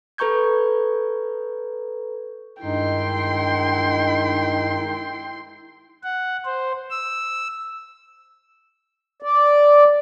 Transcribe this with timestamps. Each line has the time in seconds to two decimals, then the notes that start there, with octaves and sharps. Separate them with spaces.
0.18 A4 B4 A#5 C#6 G6 G#6
2.62 G2 D#3 G#3 D#4 E4 G5 C6
6.04 F#5
6.45 C5
6.90 E6
9.22 D5